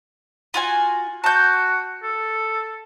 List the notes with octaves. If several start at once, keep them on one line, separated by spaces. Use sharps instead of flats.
F4 F#4 G#5
F#4 A5 G6
A4